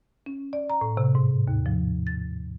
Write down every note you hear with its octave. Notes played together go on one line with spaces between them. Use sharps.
C#4
D5
A#5
A2
C3
G#2
D#2
F3
A6